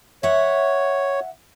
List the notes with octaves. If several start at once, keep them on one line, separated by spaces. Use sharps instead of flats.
C#5 E5 F#5